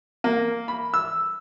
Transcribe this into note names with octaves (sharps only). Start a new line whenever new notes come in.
A#3
B5
E6